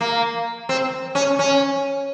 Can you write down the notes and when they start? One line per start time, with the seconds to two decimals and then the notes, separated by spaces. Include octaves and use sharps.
0.01 A#3
0.69 C4
1.15 C#4
1.39 C#4